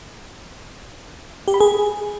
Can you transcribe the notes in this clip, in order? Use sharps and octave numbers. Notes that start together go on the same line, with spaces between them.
G4
B5
G#4